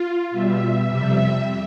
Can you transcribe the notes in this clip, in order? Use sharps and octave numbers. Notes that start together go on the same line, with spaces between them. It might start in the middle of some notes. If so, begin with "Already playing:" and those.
Already playing: F4
B2 G3 E5
F2 C3 G3